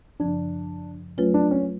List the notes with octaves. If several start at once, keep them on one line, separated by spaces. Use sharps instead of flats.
F#2 C#3 F3 D4
F#3 A3 C#4 F4 B4
D4
C#4